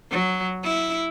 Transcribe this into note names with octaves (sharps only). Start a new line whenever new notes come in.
F#3
E4